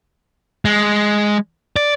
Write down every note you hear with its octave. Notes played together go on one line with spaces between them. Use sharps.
G#3
D5